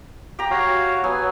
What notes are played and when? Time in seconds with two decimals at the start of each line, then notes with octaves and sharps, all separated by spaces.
0.39 G4 A#5
0.51 F#4 C#5 F5
1.04 F#3 B3 G#5